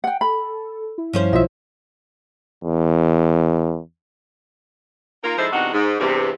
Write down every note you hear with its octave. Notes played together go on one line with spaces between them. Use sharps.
F#5 G5
A4 B5
E4
G2 F3 C#4 C5
B1 F4 D#5 E5 E6
E2
A#3 D#4 F4 A#4
F3 G#3 D#4 E4 A4 C5
E2 C3 D4 D#4 F#4
G#2
E2 G2 C3